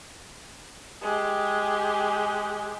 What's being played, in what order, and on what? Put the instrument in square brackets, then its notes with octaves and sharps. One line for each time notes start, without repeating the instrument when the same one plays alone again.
[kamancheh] G#3 G4